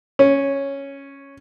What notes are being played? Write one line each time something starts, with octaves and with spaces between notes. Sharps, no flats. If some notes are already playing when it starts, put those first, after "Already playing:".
C#4